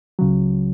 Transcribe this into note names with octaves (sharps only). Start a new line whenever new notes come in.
C#2 C#3 F#3